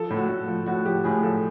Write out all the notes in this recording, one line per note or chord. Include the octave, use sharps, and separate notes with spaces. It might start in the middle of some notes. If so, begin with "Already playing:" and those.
Already playing: F3 A4
A2
F#4
A2
F3
A2 F#4
F3 G4
A2 G#4
F3 A4